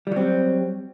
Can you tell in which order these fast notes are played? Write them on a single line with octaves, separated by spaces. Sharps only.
G3 F#3 C4